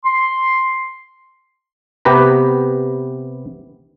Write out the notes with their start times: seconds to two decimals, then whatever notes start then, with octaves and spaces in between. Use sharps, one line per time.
0.05 C6
2.05 C3 B3 G4 B4 A#5